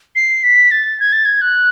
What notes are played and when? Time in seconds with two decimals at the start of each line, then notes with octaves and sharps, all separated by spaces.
0.16 C7
0.43 B6
0.71 A6
1.00 G#6
1.12 A6
1.25 G#6
1.41 F#6